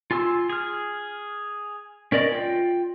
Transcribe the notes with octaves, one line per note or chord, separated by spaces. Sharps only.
F4 G#5 C6 E6
G#4 F6
C#4 A#4 D5 D#5
F4 G5